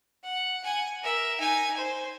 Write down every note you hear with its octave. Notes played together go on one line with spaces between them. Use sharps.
F#5
F#5 G#5
A#4 E5
D#4 G#5
C5